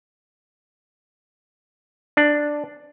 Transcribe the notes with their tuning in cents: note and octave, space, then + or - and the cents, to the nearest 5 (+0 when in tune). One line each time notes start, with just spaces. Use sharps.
D4 +5